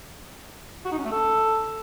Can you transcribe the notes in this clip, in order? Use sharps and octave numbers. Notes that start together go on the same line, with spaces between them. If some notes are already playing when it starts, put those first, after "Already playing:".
F#4
D#4
C#4
A3
A4